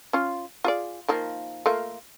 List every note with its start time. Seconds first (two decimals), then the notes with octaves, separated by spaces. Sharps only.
0.13 C#4 F4
0.64 F4 G#4 D5
1.08 D#3 F3 A#3
1.66 A3 A#3 F4